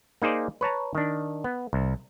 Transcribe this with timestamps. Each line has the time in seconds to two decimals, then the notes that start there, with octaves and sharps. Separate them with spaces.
0.22 A#3 D#4 G#4 C5 D5
0.61 B4 C#5 A5 A#5
0.95 D#3 D4
1.44 B3
1.73 C2